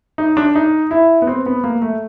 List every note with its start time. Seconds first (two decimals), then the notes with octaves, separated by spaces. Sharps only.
0.18 D#4
0.37 D4
0.55 D#4
0.91 E4
1.22 B3
1.27 C4
1.46 B3
1.64 A#3
1.82 A3